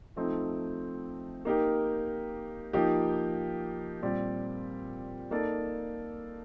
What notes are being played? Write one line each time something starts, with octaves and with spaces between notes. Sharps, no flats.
F3 A3 C4 D#4
A#3 D#4 G4 A#4
F3 A#3 D#4 G4
A#2 G3 C4 G4 D5
A#3 D#4 A4 D5